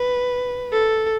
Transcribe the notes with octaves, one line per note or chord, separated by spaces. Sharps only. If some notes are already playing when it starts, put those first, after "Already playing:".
Already playing: B4
A4